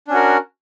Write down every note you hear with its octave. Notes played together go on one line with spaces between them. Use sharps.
C#4 D4 F#4 A#4